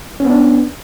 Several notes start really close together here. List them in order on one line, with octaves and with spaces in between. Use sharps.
C#4 B3 D4